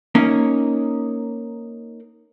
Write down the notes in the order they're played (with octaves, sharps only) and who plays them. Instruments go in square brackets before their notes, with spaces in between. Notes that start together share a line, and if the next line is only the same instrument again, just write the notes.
[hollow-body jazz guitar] A#3 C#4 D#4